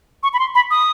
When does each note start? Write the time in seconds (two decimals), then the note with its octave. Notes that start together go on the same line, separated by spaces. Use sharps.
0.23 C#6
0.34 B5
0.39 C6
0.55 B5
0.71 D#6